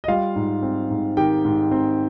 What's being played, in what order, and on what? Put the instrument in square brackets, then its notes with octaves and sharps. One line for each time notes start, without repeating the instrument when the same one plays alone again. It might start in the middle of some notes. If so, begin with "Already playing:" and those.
[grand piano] D#5
G3 F4 F5
G#2
C4
G#2
D#3 G4 G5
G#2
C4